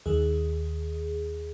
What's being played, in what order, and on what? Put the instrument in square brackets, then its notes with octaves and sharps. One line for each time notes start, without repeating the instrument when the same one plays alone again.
[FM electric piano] D#2 D#3 G#4